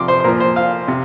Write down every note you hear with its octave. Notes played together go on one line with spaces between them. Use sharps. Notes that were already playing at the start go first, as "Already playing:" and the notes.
Already playing: C3 F3 C6 D6
C5
C5
A#2 F3 A#4
C5
F5
C3